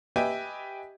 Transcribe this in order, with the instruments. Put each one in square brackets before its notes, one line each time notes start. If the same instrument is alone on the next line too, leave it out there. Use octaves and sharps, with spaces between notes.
[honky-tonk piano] G4 B4 D#5 E5 G5 G#5